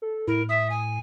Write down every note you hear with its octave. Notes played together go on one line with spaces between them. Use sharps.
A4
A2 E4 A#4
E5 D#6
G#5